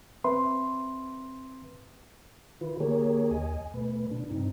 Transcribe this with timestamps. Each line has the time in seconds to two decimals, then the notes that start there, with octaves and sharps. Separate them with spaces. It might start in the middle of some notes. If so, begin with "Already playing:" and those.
0.24 C4 B4 E5 C6
2.61 D#3 E4 F4 B4
2.80 D3 A#3 G4 G#4 A#4 C#5
3.31 D#2 D#5 G#5
3.74 B2 A3 B4
4.11 B2 D4
4.31 G2 C3 C4 D#4